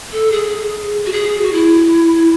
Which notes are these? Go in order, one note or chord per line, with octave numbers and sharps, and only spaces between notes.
A4
G#4
F#4
G#4
F#4
E4